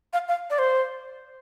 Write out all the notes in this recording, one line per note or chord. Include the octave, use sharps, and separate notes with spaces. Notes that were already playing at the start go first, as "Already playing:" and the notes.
F5
F5
D5
C5